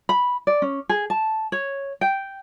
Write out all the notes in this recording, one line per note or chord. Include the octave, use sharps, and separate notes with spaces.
B5
D5
C#4
G#4
A5
C#5
G5